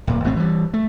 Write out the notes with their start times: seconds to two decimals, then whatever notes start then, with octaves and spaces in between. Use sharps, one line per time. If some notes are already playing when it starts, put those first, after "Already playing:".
0.07 D1 A#2
0.24 G#1 B2 A3 C4
0.36 E3 G3
0.74 A3